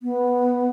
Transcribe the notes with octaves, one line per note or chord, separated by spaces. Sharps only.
B3